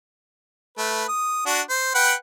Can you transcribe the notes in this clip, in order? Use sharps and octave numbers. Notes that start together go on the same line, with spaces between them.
A3 B4
D#6
D4 F#4
C5
B4 F#5 G5